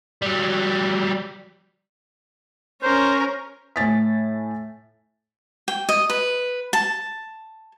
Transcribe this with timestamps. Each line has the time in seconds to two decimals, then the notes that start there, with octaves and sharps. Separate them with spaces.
0.22 F#3 G3
2.83 C#4 A#4 C5
3.76 A2 G#5 A6 B6
5.68 G5
5.89 D#5
6.10 B4
6.73 A5